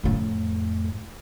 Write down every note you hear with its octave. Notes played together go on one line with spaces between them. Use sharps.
F2 A2